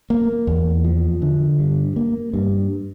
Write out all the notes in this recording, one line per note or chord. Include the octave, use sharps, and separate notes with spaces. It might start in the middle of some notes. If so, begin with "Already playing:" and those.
A#3
E2
F3
D3
G2
A#3
G2